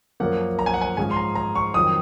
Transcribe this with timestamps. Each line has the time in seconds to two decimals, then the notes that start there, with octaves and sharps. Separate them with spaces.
0.20 F#2 F3 A#3 F#5
0.59 A#5
0.66 G#5
0.74 F#5
0.81 G#5
0.97 G#2 F3 G#3 C#4 G#5
1.11 C6
1.16 A#5
1.35 A#5
1.55 C#6
1.74 F2 D#3 F#3 D#6